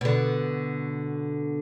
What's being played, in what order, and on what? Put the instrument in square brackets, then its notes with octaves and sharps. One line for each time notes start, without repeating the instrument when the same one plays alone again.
[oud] B2 D3